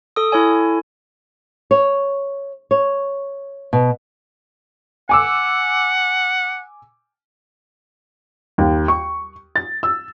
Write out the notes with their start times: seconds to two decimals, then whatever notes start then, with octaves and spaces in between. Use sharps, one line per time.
0.16 A4 D#6
0.32 E4 A4 C#5 G#5
1.71 C#5
2.71 C#5
3.73 B2
5.09 F#5 G#5 D6 E6
8.58 D#2
8.88 C#6
9.56 A6
9.83 E6